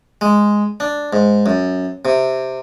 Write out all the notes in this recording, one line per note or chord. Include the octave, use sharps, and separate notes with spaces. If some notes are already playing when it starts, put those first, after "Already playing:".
G#3
D4
G#2
F#2
C3